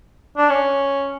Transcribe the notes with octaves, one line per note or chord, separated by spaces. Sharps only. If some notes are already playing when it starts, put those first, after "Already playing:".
D4
C#4